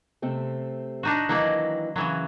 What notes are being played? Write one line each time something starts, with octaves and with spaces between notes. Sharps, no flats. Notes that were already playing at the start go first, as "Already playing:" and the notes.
C3 A3 C4
D4 D#4 F#4
D#3 E3 F#3 A#3 D5
C#3 E3 F#3